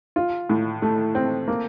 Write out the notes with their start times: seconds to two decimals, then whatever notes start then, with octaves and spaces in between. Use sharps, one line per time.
0.16 F4
0.49 A2
0.82 A3
1.15 C4
1.48 A#3